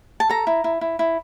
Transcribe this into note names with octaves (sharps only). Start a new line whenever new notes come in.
A5
A4 A#5
E4
E4
E4
E4